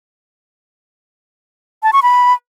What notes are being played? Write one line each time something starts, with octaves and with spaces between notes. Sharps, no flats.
A5
C#6
B5